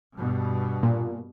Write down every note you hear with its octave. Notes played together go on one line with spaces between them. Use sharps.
G2 B2
A#2